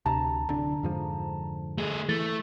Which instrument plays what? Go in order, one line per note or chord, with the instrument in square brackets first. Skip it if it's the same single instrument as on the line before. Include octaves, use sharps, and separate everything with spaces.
[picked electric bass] D2 [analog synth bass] C3 [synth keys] A5 A#5
[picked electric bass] D1 D4 [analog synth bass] D3
[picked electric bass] F2 G#2 F3
[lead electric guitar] A3 G#4
[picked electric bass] E3 [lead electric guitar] A3 [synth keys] A6